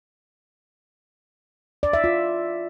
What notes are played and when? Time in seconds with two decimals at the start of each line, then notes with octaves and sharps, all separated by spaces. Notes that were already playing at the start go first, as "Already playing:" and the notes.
1.83 D5
1.93 E5
2.04 F4